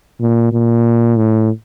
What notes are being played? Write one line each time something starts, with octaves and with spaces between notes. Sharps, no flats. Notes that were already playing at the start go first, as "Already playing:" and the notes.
A#2
A#2
A2